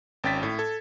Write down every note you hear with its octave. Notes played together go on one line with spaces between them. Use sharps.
G#1 C#4 G5 A6 B6
A2
A4 G#6